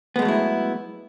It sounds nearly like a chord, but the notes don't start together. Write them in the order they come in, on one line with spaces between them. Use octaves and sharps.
B3 G#3 A3 F#3 E4